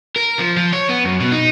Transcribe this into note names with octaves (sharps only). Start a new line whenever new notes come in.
A#4
F3
F3
C#5
B3
F#2
B2
D#4